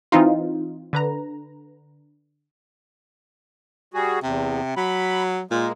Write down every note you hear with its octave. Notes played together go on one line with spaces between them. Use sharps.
E3 C4 D#4 F4
D3 B4 A#5
G3 F#4 G#4
E2 C3
F#3 B5
A#2 G#3 A#3